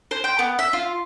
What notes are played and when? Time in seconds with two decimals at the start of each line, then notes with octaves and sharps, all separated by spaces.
0.11 C5
0.24 G5
0.39 B3
0.59 E5
0.73 F4